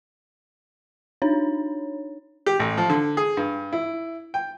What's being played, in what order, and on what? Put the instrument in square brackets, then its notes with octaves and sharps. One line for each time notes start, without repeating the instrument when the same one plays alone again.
[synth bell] D4 D#4 C#5
[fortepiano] G4
A1
F3
D3
G#4
G2
E4
G5